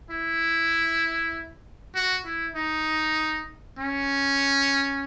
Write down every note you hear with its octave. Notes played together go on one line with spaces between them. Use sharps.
E4
F#4
E4
D#4
C#4